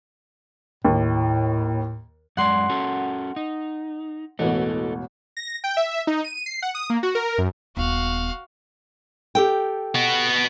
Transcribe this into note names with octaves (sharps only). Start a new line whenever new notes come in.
D#2 A2
F#2 G#3 D5 F#5 C6
C#4 F#4 A4
D#4
E1 A1 B2 A4 D#5
A#6
G5
E5
D#4
D#7
C7
F#5
D#6
A#3
F#4
A#4
F#2
D#1 B3 F#4 F5
G4 A4 G5
B3 F#4